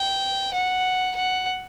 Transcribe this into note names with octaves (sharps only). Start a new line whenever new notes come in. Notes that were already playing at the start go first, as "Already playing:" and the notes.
Already playing: G5
F#5
F#5